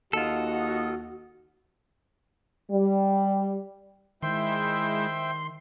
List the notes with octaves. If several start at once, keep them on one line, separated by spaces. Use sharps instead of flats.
D#2 F4 F#4 A4 D#5 F#5 D#6
G3
D#3 G#3 E4 C5 E5 G5 C6